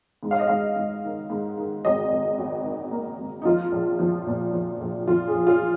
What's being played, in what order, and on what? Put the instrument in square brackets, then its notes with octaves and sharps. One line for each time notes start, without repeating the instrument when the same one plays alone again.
[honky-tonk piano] G#2
F5
D#5
G#2 F5
G#2
D#3
G#2
D#3
G#1 D#5
G#1
G#1
D#3
A#3
G#1
D#4
F3 F4
A#1
F3
A#2
F3
A#1
F3 F4
G#4
A#1
F4